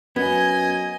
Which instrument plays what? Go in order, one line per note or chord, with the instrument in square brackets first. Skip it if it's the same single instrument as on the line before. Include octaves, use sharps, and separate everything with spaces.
[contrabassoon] F#2 [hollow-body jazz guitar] B3 [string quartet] D#5 G#5 [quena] G#6